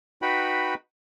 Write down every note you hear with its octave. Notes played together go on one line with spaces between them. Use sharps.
D#4 F#4 B4 G5 B5